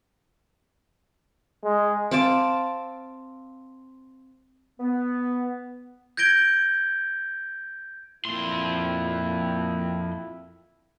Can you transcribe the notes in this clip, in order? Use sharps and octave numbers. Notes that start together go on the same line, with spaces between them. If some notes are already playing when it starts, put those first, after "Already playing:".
G#3
C4 F5 A5 D6
B3
G6 G#6 A#6 D7 G7
F2 A#2 E4 C6